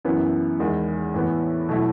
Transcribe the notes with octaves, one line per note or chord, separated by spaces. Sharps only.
F#2 E3 B3 E4
E2 D#3 G#3
A2 E3 B3
B2 F#3 A3 E4